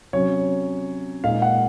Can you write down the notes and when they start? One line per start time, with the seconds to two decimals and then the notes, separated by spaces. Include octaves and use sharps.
0.13 C3 F#3 C#4 C#5
1.24 A#2 G#3 D#4 F5
1.42 F#5